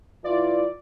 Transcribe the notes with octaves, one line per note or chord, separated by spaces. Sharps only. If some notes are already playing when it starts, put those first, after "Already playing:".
E3 E4 F4 D5